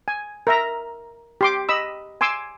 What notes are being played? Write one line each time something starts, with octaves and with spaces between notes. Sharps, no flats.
G#5
A#4 E5 A#5
G4 C6 D6
D#5 B5 E6
G#5 C6 D6 E6